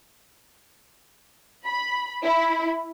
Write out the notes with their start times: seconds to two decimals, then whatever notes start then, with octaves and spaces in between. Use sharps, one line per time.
1.65 B5
2.23 E4